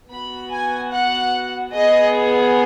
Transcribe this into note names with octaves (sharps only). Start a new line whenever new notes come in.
B3 F#4 B5
G#5
F#5
B3 G#4 D#5